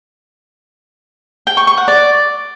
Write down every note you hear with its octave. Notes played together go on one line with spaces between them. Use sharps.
G5
C#6
C#6
F#5
D5